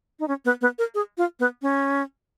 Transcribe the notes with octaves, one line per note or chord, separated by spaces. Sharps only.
D#4
C#4
B3
B3
A#4
G#4
F4
B3
C#4